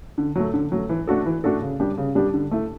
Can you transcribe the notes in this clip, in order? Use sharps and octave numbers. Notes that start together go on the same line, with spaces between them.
D3
F#3 A3
D3
F#3 A3
E3
A3 D4 F#4 A4
E3
A3 D4 F#4 A4
C#3
G3 D4 G4
C#3
G3 D4 G4
D3
A3 E4